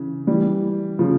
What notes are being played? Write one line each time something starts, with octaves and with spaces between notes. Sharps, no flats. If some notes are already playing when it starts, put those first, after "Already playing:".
Already playing: C#3 E3
E3 G3
C#3 F3